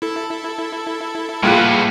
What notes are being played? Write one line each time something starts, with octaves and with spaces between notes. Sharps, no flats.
E4 A4
A#1 A2 G3 B3 F4 G#4 F#6